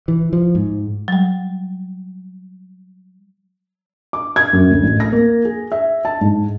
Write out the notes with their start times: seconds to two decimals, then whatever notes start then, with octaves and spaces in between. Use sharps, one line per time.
0.08 E3
0.33 F3
0.55 G#2
1.08 F#3 G3
4.13 D6
4.36 G#6
4.53 F#2
4.71 D2
4.83 A1
5.00 A#6
5.12 A#3
5.45 G#4
5.72 E5
6.05 A5
6.21 G#2